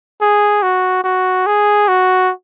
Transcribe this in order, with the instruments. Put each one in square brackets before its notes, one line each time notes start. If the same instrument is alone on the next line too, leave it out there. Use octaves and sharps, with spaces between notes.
[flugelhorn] G#4
F#4
F#4
G#4
F#4